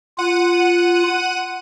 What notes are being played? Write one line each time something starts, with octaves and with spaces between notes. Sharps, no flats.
F4 F#5 D#7